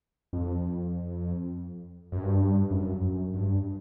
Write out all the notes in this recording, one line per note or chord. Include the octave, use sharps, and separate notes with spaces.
F2
F#2
G2
F#2
F#2
G2